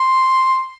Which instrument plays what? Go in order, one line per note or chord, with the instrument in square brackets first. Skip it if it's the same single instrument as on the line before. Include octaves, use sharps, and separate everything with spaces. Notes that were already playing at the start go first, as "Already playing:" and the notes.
Already playing: [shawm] C6